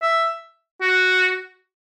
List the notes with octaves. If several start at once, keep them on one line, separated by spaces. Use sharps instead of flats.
E5
F#4